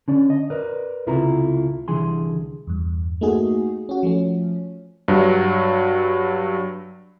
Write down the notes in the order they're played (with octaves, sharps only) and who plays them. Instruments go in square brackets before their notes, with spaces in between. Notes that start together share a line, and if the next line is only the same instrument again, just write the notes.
[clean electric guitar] D3 C#4 D5
D#5
A#4 B4 D5
C#2 C3 E4 F4 A4 A#5
C2 D3 E3 G#4 G#5 C6
[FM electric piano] E2 G2
A3 A#3 D#4 F#4 G#4
C#4 F#4
F3 A3 C#4
[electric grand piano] G2 F#3